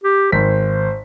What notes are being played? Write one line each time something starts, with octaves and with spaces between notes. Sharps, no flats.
G4
G#1 C5 B6